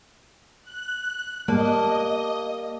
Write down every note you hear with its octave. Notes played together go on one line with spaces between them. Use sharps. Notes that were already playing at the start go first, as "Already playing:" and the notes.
F#6
G3 A#3 D#5 A5